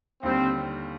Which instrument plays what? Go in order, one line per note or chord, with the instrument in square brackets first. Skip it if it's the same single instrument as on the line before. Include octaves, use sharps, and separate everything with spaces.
[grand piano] D#2 D3 G3 [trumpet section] C4